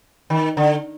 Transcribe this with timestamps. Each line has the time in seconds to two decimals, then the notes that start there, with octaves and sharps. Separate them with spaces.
0.30 D#3
0.57 D3